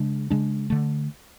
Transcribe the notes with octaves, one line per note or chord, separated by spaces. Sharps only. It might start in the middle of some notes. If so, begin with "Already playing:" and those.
Already playing: C#3 G#3 D4
C#3 G#3 D4
D3 A3